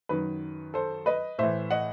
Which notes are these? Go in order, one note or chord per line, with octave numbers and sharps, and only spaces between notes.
F#2 D#3 B4
A4 C5
B4 D#5
A2 E3 C5 E5
D#5 F#5